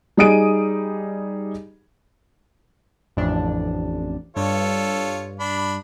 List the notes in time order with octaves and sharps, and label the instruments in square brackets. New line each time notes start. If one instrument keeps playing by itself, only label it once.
[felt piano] G3 D#4 G#4 D#6 D7 D#7
[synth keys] A1 F2 D4
[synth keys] G2 [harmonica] F4 A4 C#5
[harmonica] D4 B5